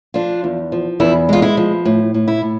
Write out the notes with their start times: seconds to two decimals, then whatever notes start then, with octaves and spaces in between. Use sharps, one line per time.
0.14 F3 D4 F4
0.44 E2
0.72 F3
1.00 E2 E4
1.29 G#3 F4
1.42 E4
1.57 F3
1.85 A2
2.14 A2
2.28 E4
2.42 A2